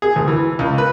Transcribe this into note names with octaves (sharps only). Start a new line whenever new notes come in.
G#4
D2
E3
C#2
B4